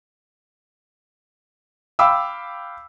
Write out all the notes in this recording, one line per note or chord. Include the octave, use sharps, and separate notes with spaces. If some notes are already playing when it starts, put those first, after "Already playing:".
F5 G5 B5 D6 E6